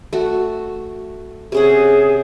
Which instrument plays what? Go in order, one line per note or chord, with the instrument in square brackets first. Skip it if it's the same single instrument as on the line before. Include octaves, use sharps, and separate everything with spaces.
[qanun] A3 F#4
[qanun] C3 C#4 F#5 [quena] G#4